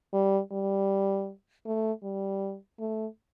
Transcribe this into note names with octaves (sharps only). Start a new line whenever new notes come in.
G3
G3
A3
G3
A3